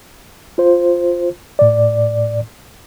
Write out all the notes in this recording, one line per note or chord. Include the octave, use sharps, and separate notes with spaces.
F4 C5
A2 D5